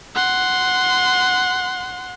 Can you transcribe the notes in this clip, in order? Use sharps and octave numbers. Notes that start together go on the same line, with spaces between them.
F#5 C6